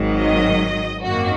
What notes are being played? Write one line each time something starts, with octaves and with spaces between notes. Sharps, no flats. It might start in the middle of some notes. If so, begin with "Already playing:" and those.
Already playing: G#1 G#2 D#3 F#3
D#5
G#1 F#2 D#3 A#3 F#4